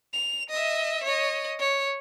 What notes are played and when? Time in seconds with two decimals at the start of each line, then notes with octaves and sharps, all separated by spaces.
0.14 F7
0.50 D#5 E5
1.04 C#5 D#5
1.59 C#5